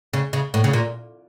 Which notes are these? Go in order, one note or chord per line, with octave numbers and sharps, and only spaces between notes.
C#3
C#3
A2
C#3
A#2